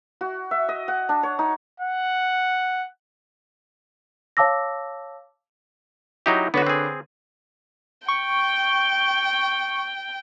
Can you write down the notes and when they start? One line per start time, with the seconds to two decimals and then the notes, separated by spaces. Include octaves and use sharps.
0.21 F#4
0.51 E5
0.69 D#5
0.88 F#5
1.09 D4
1.23 C#5
1.39 D#4
1.80 F#5
4.37 C#5 F5 A5 D6 E6 A#6
6.26 F#3 D#4 E4 G4
6.54 D3 B3 F#4 B4 C#5
6.67 C4 G#4
8.08 G5 C#6